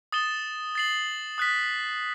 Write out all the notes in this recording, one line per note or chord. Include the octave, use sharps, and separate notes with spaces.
D#6 A6 E7 G7
A6 C7 F#7
D#6 F#6 B6